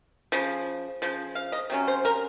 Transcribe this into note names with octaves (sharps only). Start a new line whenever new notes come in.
C#3 F3
C#3 F3
F5
D#5
C3 F#3 C#4
C5
A#4